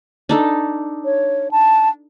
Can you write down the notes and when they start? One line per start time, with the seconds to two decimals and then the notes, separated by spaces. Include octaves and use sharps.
0.29 D4 D#4 A4
1.05 C#5
1.51 A5